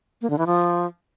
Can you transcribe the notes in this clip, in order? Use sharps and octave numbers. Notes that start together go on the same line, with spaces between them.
A#3
D3
E3
F3